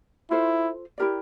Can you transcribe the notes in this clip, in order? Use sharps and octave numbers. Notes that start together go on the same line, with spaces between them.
E4 F4 A4 C5
E4 G4 A#4 D5